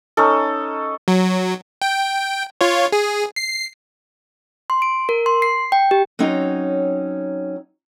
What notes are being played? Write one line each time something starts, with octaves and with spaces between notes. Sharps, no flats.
C#4 D#4 A4
F#3
G5
F4 C#5
G#4
C7
C6
D7
A#4
C6
C7
G5
G4
F#3 C4 C#4 D#4 A#5